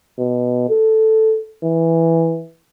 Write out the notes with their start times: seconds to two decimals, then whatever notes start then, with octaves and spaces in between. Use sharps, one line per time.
0.18 B2
0.70 A4
1.64 E3